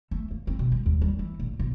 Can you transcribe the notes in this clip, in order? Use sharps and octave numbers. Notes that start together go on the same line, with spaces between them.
A3
A#3
C4
B2
G#3
D#2
G3
E3
A#1
B1